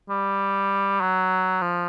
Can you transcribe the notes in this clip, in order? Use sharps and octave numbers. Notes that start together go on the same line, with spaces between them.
G3
F#3
F3